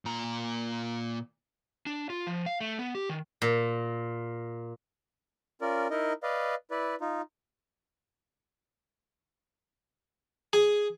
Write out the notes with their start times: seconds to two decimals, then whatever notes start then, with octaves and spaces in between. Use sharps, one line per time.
0.05 A#2 A#5
1.86 D4
2.10 F4
2.27 F3
2.46 F5
2.61 A3
2.79 B3
2.95 G4
3.09 D#3
3.42 A#2
5.61 C#4 F4 A#4 D5
5.91 D#4 E4 A#4 D#5
6.23 B4 D5 D#5 F5
6.71 E4 B4 D5
7.01 D#4 F4
10.53 G#4